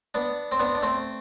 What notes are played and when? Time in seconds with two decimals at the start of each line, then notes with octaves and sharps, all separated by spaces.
0.14 B3 D4
0.52 C4
0.60 B3 D4
0.75 D4
0.82 A3 C4